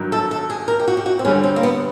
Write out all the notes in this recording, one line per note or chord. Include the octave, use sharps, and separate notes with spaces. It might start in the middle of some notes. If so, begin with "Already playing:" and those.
Already playing: G2 D#3 F#3
A4
A4
G#4
A#4
G4
F#4
G4
F#4
C4
G2 D3 G3 C#4
C4
A#3
B3